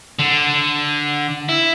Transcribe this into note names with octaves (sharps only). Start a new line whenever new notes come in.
D3
E4